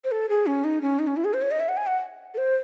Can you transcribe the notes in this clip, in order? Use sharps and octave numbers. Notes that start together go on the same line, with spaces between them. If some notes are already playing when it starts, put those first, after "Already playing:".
C5
A4
G#4
C#4
D#4
C#4
D#4
C#4
E4
G#4
C5
C#5
D#5
E5
F#5
G#5
F#5
A4
C5